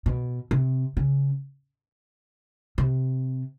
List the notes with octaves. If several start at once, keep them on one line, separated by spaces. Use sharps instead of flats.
B2
C3
C#3
C3